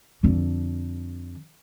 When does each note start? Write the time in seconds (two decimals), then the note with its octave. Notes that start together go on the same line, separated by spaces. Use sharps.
0.23 F2 D3